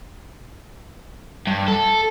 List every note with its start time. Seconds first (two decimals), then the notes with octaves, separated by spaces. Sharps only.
1.47 G2
1.68 A4